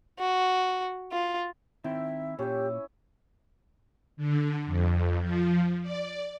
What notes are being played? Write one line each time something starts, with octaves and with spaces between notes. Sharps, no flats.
F#4
F4
D#3 C4 E4 E5 G5
A#2 C#4 G4 E5
D3
F2
F3
D5